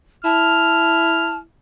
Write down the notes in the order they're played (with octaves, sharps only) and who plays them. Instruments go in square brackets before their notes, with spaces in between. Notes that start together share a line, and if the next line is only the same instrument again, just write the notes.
[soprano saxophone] E4 [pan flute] A5 [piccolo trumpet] F6